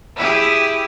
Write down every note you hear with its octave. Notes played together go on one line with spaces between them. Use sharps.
E4 G4 G#4